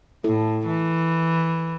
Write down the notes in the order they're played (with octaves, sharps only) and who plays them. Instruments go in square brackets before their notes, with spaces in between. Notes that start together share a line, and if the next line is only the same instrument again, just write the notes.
[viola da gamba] A2 [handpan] E4 A4
[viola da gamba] E3